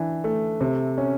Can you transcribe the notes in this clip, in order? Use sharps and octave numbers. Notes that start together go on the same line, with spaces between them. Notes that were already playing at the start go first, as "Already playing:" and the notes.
Already playing: E3 D4
A3
C3
C#4